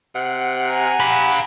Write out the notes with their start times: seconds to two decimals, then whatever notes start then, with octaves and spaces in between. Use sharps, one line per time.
0.15 C3 F#5
0.69 G#5 A#5
1.00 G4 F5 B5